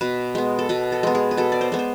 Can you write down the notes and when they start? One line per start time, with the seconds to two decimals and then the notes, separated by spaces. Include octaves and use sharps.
0.01 B2 B4
0.35 G#3 B3
0.59 A4
0.69 B2 B4
0.92 A4
1.03 G#3 B3
1.15 G#4
1.31 B4
1.37 B2 A4
1.52 D5
1.61 C5
1.72 G#3 B3
1.79 C5